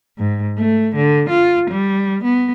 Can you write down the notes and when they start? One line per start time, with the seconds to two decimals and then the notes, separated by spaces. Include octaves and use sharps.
0.18 G#2
0.58 A3
0.96 D3
1.30 F4
1.71 G3
2.24 B3